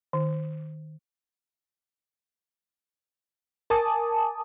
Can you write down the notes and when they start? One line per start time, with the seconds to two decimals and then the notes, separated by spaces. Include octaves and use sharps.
0.13 D#3
3.70 A#4 G#5 A5 D6 D#6